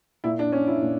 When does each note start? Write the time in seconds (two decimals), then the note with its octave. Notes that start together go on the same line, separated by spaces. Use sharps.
0.24 A#2 E4
0.39 D4
0.52 C#4
0.68 E4
0.82 A#2